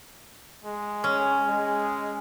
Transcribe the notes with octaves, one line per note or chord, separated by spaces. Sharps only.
G#3
C#4
G#3